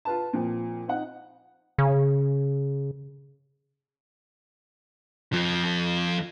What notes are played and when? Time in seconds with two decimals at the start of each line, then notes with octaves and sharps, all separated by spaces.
0.05 F4 B4 A5
0.33 A#2 F3 C4
0.88 C4 D#4 F#5
1.78 C#3
5.33 F2 F3